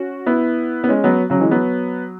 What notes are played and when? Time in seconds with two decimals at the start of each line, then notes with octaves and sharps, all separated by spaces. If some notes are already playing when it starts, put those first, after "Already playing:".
Already playing: C#4 F#4
0.26 B3 E4
0.84 B3
0.89 G#3 C#4
1.04 F#3 B3
1.30 C#3 F#3
1.40 E3 G#3
1.51 F#3 B3